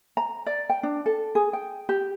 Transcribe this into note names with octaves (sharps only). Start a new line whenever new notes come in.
A#5
D5
G5
D4
A4
G#4
G5
G4